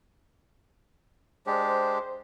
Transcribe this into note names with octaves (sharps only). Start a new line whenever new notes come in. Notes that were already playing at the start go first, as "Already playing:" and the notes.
G#3 D4 G4 C5